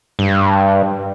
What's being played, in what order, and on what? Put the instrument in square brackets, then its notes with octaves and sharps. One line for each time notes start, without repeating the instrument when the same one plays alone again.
[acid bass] G2